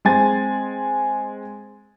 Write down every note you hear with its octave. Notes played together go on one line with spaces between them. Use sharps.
G#3 C4 G#5 A6